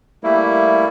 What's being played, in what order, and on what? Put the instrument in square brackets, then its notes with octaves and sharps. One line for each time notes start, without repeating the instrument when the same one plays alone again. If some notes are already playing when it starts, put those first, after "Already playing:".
[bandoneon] G3 A3 A#3 E4